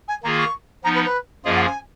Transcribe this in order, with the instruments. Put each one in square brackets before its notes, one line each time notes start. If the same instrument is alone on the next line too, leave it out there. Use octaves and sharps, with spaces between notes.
[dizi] G#5
[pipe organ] D#3 A#3 F4 G#4 [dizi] A#5
[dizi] C#6
[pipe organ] F3 B3 D#4 [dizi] A#5
[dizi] B4
B4
[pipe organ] F#2 F3 A#3 F4 G#4 [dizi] D#5
[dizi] F#5
G#5